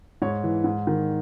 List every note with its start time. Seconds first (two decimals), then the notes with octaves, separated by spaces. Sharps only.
0.22 G#2 C#5
0.44 E3
0.64 G#2
0.87 D#3